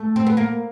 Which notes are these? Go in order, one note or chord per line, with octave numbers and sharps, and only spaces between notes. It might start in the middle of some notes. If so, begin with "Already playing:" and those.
Already playing: A3
C4
B3
A#3